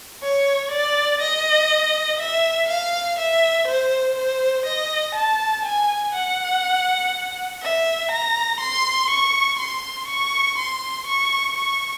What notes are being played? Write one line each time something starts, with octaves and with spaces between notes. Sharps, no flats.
C#5
D5
D#5
E5
F5
E5
C5
C5
D#5
A5
G#5
F#5
E5
A#5
C6
C#6
C6
C#6
C6
C#6
C#6